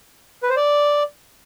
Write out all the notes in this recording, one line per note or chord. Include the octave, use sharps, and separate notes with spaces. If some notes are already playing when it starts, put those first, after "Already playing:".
B4
C5
D5